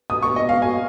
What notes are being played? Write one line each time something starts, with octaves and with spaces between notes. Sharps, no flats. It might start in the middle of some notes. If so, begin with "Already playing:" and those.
D#6
C#6
D#5
F5
G#5